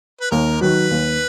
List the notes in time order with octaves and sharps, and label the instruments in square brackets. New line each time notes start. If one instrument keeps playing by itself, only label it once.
[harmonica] B4
[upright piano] D#2 [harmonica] A#4
[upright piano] D#3 F#3 [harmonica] B4
[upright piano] D#2